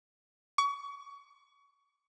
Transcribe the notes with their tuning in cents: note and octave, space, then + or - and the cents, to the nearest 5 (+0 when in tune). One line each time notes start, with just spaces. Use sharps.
C#6 +30